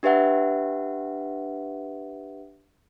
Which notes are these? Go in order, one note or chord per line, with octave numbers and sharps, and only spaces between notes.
D4 G4 B4 E5 F#5